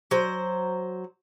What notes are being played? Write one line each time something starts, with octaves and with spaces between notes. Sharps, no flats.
F#3 C5